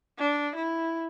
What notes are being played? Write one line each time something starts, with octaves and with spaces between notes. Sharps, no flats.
D4
E4